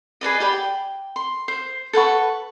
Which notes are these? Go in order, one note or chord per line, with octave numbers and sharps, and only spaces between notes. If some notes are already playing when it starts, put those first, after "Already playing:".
G#4 B4 D5 D#5
G4 D5 B5
G5
C6
C5
A4 B4 F#5 C#6